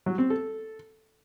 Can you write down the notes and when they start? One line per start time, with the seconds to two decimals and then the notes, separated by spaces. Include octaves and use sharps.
0.06 F#3
0.18 C4
0.30 A4